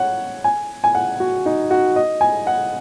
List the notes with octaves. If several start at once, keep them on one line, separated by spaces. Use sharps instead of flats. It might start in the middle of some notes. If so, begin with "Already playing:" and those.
Already playing: C#5 F#5
G#5
G#5
F#5
F#4
D#4
F#4
D#5
G#5
F#5